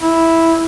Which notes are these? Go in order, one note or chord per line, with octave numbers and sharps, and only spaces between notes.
E4